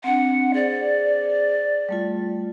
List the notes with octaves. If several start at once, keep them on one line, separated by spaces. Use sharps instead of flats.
C4 D4 F#5
G#4 C5 D5
G3 A3 F4